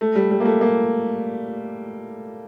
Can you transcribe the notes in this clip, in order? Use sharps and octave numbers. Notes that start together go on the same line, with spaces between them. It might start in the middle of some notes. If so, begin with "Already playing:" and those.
A3
G3
G3
A#3
A3
A#3